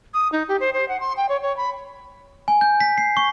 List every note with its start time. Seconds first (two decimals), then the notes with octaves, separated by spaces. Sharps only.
0.14 D#6
0.32 D#4
0.48 G4
0.60 C5
0.74 C5
0.88 F#5
1.00 C6
1.17 G5
1.29 C#5
1.42 C#5
1.57 B5
2.48 G#5
2.61 G6
2.80 B6
2.98 C7
3.17 C#6